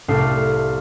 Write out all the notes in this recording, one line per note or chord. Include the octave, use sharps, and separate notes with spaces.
C2 A2 A3 D4 F5 C7